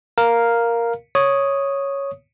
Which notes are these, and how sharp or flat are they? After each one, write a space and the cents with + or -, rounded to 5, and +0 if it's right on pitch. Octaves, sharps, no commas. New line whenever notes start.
A#4 +0 F5 +0
C#5 +0 D#6 +0